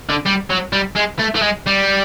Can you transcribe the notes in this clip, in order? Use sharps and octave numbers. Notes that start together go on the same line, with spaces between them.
D3
G3
F#3
G3
G#3
A3
A3
G#3
G3